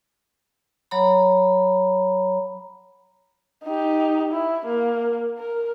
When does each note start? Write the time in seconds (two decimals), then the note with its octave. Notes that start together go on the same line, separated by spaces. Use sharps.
0.91 F#3 C#5 A#5 B5
3.65 D#4 G4
4.32 E4
4.66 A#3
5.38 A#4